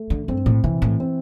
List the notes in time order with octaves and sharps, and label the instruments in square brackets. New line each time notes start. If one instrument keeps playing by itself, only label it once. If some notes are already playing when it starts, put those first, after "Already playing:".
Already playing: [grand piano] A3
[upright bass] D3
[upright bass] G2 [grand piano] C4
[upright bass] A2
[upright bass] C3 [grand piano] E3
[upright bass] A2
[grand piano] C4